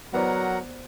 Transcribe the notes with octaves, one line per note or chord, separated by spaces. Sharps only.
F#3 B3 A#4 C5 D5 F#5 A#5